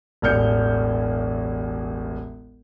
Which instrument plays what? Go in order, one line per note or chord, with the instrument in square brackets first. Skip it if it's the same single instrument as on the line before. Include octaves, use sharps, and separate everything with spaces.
[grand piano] E1 A1 F6 G6 C#7